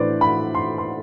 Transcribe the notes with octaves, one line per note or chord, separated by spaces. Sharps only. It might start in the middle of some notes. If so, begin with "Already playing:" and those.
Already playing: A2 E3 A3 D4 B4 C5 D5
B5
C6
C6